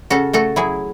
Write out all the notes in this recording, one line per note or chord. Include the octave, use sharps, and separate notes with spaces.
C#3 F#4 A4
A3 F#4 A4
F#3 E4 G#4